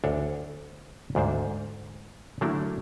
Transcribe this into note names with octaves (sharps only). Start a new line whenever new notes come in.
D2 D4 A4 C#5 F#5
D2 G#2 D4 C5
D3 F#3 A3 A#3 D4 E4